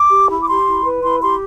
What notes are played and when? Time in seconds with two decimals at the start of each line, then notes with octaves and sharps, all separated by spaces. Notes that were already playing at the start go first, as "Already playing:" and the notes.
Already playing: D6
0.10 G4
0.29 E4
0.41 D6
0.47 G4 C6
0.66 E4
0.84 B4
1.03 E4 C6
1.22 G4 C6